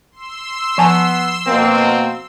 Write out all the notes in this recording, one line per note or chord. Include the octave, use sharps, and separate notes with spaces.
C6 E6
F3 B3 G#5 A5
B2 A#3 C4